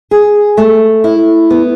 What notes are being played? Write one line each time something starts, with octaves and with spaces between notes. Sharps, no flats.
G#4
A3
E4
B3